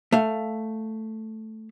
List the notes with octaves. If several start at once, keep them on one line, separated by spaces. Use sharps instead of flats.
A3 F5